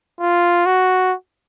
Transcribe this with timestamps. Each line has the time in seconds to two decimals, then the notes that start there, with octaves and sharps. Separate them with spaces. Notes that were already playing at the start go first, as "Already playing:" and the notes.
0.20 F4
0.66 F#4